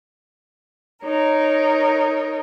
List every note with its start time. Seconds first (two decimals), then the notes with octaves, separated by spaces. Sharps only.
1.05 D#4 A#4 C#5